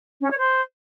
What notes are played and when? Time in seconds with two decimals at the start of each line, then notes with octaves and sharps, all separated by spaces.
0.22 C#4
0.30 C#5
0.37 C5